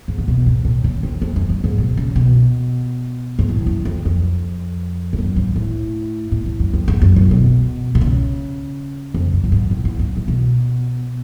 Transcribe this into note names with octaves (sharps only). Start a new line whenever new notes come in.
G#2
C#3
B2
G#2
A2
C#3
F2
F2
F2
F#2
G#2
B2
C#3
B2
G#2
A2
F#2
F2
F2
G#2
F#2
G#2
A2
A2
A2
F#2
F2
G#2
F#2
A2
B2
B2
C#3
F2
F#2
A2
G#2
A2
G#2
F#2
A2
B2